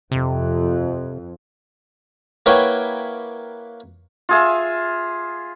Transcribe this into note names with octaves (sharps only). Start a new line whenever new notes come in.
F2 C3
A#3 E4 B4 C#5 F#5 G5
F4 G#4 E5